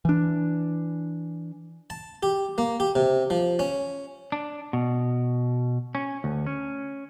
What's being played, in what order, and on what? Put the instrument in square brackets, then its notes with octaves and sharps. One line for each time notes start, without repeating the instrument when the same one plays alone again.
[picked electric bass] E3 D4
[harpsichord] A5
G4
A#3
G4
C3
F3
C#4
[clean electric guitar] D4
B2
C#4
D2
C#4